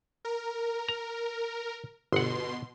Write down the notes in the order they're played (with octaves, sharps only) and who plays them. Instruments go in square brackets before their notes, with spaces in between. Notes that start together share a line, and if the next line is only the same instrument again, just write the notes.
[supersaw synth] A#4
[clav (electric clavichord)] A#5
[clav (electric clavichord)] G1 F#5 [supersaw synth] B2 C6